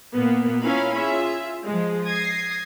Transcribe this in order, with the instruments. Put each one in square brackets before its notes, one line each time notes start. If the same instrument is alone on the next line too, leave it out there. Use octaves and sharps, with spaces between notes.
[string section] A#2 A#3 B3
C#4 E4 F4 A#4 F5 B5
F4 G#4 E5
F3 G#3
D#6 G#6 A#6 C7